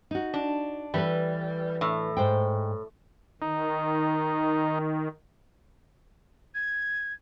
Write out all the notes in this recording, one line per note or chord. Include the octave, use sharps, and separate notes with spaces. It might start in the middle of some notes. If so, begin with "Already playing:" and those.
D#4 F#4
D4
E3 G3 A4 B4
A2
G#2 C5 G5
D#3 D#4
G#6